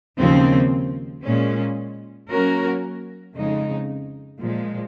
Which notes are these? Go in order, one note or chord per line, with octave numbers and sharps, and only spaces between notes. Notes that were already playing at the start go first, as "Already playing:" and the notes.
D#2 C#3 F3 C4
A#2 G#3 C#4
F#3 A#3 C#4 F#4 A#4
F2 C#3 G#3 D#4
A#2 F3 G#3